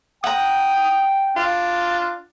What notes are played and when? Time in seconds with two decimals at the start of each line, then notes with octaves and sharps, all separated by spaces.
0.24 F#5 G5 A#5 D#6
1.37 D4 F4